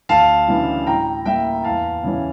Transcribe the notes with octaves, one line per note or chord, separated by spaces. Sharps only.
D2 F5 A5
C#3 E3 G3 D4
A2 G5 A#5
G3 A#3 E5 G5
E2 F5 A5
C#3 E3 G3 C#4